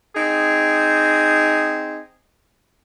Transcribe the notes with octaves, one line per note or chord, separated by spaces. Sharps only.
C4 D#4 G#4